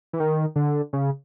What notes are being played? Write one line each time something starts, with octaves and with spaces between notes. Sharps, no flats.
E3
D#3
D3
C#3